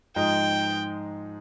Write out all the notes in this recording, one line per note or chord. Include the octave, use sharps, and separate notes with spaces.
G#2 F3 G#3 D#4 G5